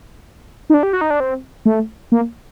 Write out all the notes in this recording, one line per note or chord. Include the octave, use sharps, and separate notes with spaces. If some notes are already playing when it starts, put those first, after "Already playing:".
D#4
D4
G4
F#4
D#4
D4
C4
A3
A#3